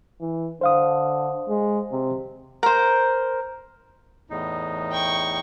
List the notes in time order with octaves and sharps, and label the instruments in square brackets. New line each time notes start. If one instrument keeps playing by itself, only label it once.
[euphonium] E3
[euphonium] D3 [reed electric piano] C5 F5 D#6
[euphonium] G#3
C3
[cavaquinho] A#4 C5
[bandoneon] E2 A2 D#4
[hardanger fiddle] G5 C#6